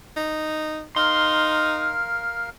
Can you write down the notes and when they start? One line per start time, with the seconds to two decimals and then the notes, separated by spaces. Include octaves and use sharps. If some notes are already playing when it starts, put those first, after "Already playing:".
0.16 D#4
0.96 D#4 A#4 F5 C6